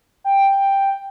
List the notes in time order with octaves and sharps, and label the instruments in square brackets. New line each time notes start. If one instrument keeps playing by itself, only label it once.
[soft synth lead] G5